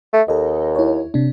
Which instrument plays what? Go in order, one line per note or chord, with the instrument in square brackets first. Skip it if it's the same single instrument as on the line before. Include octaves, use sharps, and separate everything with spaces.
[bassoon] A3
[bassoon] D#2 [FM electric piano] A4 D#5
[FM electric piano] E4 C#5
C3 D4